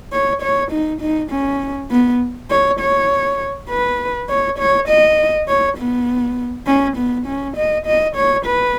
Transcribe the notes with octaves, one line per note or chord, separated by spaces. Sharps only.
C#5
C#5
D#4
D#4
C#4
B3
C#5
C#5
B4
C#5
C#5
D#5
C#5
B3
C#4
B3
C#4
D#5
D#5
C#5
B4